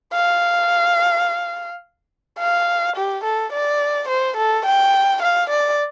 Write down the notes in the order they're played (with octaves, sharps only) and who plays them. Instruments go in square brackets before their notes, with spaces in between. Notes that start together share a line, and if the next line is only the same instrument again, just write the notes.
[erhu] F5
F5
G4
A4
D5
C5
A4
G5
F5
D5